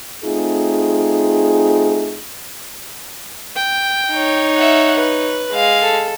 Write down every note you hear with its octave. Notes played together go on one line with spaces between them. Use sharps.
A3 C4 D#4 F4 G#4
G5
D#4 C#5
E5 F#5
B4
G#3 F5
A4